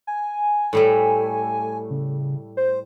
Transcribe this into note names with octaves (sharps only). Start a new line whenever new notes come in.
G#5
A2 G3 A3
C#3
C5